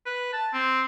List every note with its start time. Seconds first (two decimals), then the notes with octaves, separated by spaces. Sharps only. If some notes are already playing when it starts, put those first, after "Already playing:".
0.06 B4
0.33 A5
0.54 C4